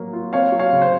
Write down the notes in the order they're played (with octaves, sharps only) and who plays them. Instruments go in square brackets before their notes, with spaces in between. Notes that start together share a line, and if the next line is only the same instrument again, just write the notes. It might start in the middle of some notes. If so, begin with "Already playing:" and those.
Already playing: [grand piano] F#3 A#3
F4
C4 C#5 F5
F#3
C#5 F5
C#3
C5